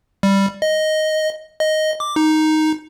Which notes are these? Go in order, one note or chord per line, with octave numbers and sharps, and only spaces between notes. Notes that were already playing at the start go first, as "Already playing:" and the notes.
G3
D#5
D#5
D6
D#4